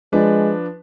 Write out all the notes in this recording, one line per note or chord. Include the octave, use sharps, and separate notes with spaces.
F3 G#3 D4 B4